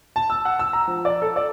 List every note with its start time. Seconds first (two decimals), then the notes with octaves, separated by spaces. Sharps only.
0.16 A5
0.30 E6
0.45 F#5
0.59 E6
0.73 A#5
0.88 F3
1.05 D5
1.22 A4
1.36 D5